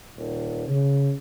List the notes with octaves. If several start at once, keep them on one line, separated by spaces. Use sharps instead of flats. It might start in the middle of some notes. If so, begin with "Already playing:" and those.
D#1
C#3